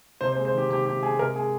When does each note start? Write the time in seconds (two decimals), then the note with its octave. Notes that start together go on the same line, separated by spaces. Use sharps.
0.21 C3 C5
0.32 C5
0.36 G#3
0.45 C5
0.54 D#3 G4
0.69 C3 G4
0.86 C3 G4
1.03 G#3 G#4
1.18 C3 A#4
1.35 G#3 G#4